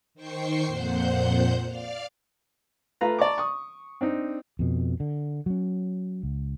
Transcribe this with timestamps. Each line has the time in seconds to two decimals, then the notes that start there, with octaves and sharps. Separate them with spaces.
0.14 D#3 C5 G5 C#6 C7
0.65 F2 A#2 C5 F#5 G6
1.65 D5 F5 F6
3.01 A3 F4 B4 F5 A#5
3.19 D5 A5 A#5 C#6 D6
3.38 C#6 D#6
4.01 C4 D4 D#4
4.59 F2 B2
5.00 D3
5.46 F#3 C#4
6.23 C#2